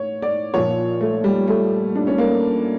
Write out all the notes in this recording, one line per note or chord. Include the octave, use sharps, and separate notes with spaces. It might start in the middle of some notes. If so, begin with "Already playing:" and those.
Already playing: A1 C#5
D5
A#1 A#2 F3 C#5
A3
G3
A3
D4
C#4
A#3